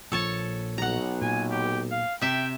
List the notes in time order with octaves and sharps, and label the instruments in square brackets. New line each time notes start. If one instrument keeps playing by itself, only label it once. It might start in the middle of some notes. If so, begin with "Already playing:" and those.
[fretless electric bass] A#1 A#2 F3 [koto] A4 C#5 A5
[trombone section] B1 [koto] F#5 A#5
[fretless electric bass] A#2 [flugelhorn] G#5
[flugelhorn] G4
F5
[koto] C3 E5 [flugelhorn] G5